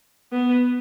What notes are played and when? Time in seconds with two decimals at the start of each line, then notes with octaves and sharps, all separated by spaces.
0.32 B3